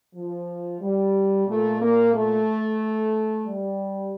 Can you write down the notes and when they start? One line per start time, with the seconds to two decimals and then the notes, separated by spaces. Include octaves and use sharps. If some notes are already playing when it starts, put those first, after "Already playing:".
0.15 F3
0.81 G3
1.48 A#2 A3
1.80 A#3
2.13 A3
3.45 G3